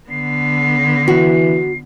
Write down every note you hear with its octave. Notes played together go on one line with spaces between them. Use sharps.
D3 B3 C7
E3 F#4